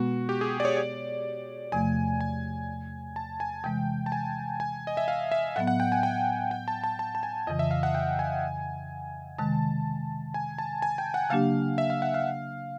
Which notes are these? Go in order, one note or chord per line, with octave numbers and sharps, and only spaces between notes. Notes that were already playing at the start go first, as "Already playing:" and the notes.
Already playing: B2 G#3 B3 F#4
G4
G#4
D5
C#5
D5
E2 C3 F3 A3 G#5
G#5
A5
G#5
C3 E3 G#3 G5
A5
G#5
G#5
D#5
E5
F5
E5
A2 F#3 B3 F#5
F#5
G5
G#5
G5
G5
A5
A5
A5
A5
G#5
F2 C#3 E3 D#5
E5
F5
F#5
G5
G#5
C3 D#3 G#3 A5
G#5
A5
G#5
G5
F#5
C#3 F#3 A#3 D4 G4 F5
E5
F5
F#5
F5